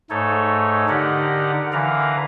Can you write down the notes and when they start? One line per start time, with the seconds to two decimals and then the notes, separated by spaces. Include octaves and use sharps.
0.10 G#2 A3 D#4 A4 C#5
0.89 D3 D#4 G4 A#4 D5 F#5
1.73 D3 E3 A#4 B4 F5 A#5